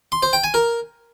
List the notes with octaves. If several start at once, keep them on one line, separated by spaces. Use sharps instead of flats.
C6
C5
G5
G#5
A#4